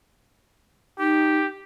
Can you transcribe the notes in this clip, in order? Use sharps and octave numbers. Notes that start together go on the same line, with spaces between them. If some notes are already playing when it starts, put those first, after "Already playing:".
D#4 G4